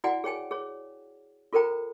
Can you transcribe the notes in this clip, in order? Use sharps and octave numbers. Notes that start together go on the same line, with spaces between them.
E4 F#4 D5 F#5 G#5
G#4 C#5 G5 G#5
G#4 C#5
F4 A4 A#4 C5 G5 A#5